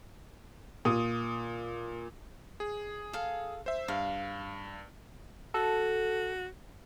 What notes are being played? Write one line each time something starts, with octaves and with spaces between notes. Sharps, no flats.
A#2 D#6
G#4
A4 F5
C5 E5
G2 F5
F#4 A4